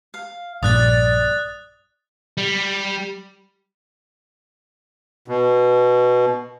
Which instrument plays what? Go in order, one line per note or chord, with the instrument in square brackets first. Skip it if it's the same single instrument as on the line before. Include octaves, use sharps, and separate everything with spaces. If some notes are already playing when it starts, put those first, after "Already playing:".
[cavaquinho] F5
[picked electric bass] A#1 G2 A#2 [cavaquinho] D5 [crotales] D#6 F#6 A6
[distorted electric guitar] G3
[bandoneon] B2